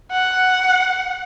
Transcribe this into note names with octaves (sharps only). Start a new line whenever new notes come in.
F#5